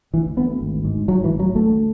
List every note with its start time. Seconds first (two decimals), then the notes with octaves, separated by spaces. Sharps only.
0.13 D2 E3
0.37 D2 B3
0.61 G#1
0.85 G#2
1.08 G#2 F#3
1.24 E3
1.32 A1
1.39 F#3
1.55 D2 A3